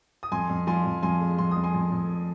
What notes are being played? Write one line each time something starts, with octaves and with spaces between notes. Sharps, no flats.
D#6
F2 G#5 C6
F2
F3 G#5 C6
F2
F2 G#5 C6
G#3
F2 C6
F2 D#6
G#5 C6
F2
F2